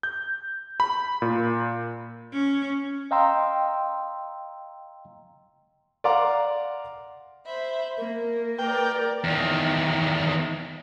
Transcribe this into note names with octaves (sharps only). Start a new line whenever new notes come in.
G6
B5
A#2
C#4
D#5 F5 G5 A#5 C6 E6
D5 F5 F#5 A#5 C6 D6
C5 E5 B5
A#3 A#4
A#4 B4 D5 G5
E2 D#3